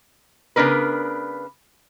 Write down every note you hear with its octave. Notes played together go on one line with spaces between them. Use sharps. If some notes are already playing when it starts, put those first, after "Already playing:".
C#3 B3 D4 A#4 B4